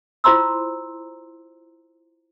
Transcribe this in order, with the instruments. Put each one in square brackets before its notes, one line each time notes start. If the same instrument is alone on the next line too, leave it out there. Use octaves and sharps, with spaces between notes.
[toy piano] E4 F4 C5 A#5 C6 E6